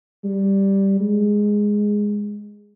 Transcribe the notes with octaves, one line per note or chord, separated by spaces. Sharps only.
G3
G#3